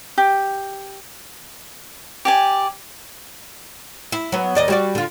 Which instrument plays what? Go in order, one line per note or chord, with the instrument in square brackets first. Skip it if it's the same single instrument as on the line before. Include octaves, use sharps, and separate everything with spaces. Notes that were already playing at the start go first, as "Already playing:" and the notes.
[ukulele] G4
[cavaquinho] G4 D5 G#5
[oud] E4
F#3 B3
D#2 D5 D#5
G3 F#4 D5
D3 F4